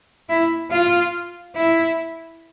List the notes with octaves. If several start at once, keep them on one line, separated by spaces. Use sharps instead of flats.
E4
F4
E4